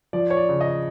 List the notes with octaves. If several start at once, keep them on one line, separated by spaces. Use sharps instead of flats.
F3 D5
C#5
D5
C#3
D#5